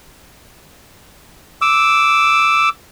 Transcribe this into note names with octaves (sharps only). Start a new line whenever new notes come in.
D6 E6